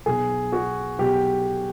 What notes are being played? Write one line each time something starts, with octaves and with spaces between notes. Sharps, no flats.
B1 B2 G#4
F#4
B1 B2 G4